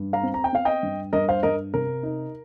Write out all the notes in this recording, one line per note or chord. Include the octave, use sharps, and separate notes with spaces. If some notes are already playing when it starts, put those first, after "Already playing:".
Already playing: G2
F5 A#5
C4
A#5
G5
C4 F5
D#5 G5
G2
G2 A#4 D#5
C5 F5
G2 A#4 D#5
C3 A#4
D#4